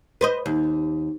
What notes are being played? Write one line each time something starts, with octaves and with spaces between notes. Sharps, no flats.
B4 C5 D#5
D#2